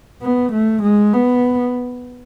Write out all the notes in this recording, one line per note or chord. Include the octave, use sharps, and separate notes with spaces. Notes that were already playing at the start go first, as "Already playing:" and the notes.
B3
A3
G#3
B3